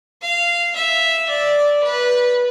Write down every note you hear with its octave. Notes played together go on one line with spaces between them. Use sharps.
F5
E5
D5
B4